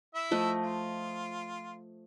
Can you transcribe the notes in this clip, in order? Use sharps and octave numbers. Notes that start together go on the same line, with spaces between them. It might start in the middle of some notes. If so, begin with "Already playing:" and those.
E4 E5
F3 A3 D#5
F4